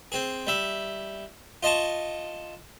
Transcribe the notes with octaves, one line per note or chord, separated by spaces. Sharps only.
C4 G#4
G3 E5
F4 D#5 A5 C#6